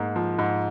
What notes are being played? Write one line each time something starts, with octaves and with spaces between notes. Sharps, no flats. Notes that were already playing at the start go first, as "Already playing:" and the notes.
Already playing: G#2 A#3
F3
G#2